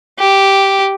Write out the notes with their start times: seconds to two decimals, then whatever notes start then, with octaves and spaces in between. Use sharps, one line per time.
0.19 G4